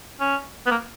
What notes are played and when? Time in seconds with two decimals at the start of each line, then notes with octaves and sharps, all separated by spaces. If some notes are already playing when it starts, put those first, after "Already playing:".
0.20 C#4
0.66 B3
0.71 A#3